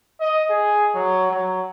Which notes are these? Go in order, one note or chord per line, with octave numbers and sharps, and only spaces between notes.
D#5
G#4
F#3
F#3